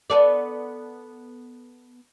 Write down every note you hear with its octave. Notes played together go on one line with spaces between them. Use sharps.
B3 A4 D5